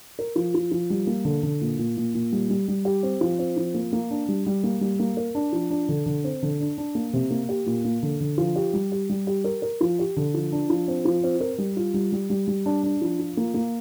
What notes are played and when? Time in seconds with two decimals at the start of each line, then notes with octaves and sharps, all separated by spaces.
0.19 A#4
0.36 F3
0.54 F3
0.72 F3
0.90 G3
1.07 A#3
1.25 D3
1.43 D3
1.61 A#2
1.79 A#2
1.97 A#2
2.15 A#2
2.32 G3
2.50 G3
2.68 G3
2.85 G4
3.03 C4
3.21 F3
3.39 C4
3.57 F3
3.74 A#3
3.93 A#3
4.11 D4
4.29 G3
4.47 G3
4.64 A#3
4.81 G3
4.99 A#3
5.17 A#4
5.35 D4
5.53 F3
5.71 D4
5.89 D3
6.06 D3
6.24 C4
6.42 D3
6.60 D4
6.78 D4
6.95 A#3
7.13 C3
7.31 A#3
7.49 G4
7.66 A#2
7.85 A#3
8.03 D3
8.20 D3
8.38 F3
8.56 G4
8.73 G3
8.92 G4
9.10 G3
9.27 G4
9.44 A#4
9.62 A#4
9.81 F3
9.99 G4
10.17 D3
10.34 F3
10.52 D4
10.70 F3
10.88 C4
11.05 F3
11.24 C4
11.40 A#4
11.58 G3
11.77 F4
11.94 G3
12.12 G3
12.30 G3
12.48 G3
12.66 D4
12.83 D4
13.01 F3
13.19 F4
13.37 A#3
13.54 A#3